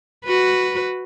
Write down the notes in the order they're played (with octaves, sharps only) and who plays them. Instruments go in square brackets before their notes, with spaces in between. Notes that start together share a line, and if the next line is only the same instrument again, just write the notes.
[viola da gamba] F#4 B4